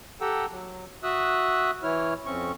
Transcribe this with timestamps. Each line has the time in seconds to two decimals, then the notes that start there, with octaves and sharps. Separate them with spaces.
0.21 G4 A4 F#5 G5 A#5 E6
0.51 F#3
1.03 F#4 E5 D#6 E6 F#6
1.83 E3 E4 C#5 F6
2.26 F2 C4 C#4 C#6